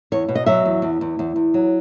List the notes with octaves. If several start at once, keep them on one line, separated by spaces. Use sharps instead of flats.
E2 C#5
B2
D#5
F#3 E5
E2
E2
E2
E2
E2
F#3